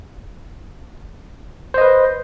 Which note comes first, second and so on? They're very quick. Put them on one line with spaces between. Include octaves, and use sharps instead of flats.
C5 D#5 B4